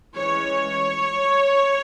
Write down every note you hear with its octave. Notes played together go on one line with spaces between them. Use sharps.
E3 G#3 C#4 C#5